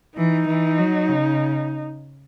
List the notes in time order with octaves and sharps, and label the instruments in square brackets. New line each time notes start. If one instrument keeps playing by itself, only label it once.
[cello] E3 [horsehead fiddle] D#4
[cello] E3
F#3
C#3